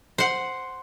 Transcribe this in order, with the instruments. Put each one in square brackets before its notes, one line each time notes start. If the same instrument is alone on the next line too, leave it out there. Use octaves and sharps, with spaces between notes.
[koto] C5 F#5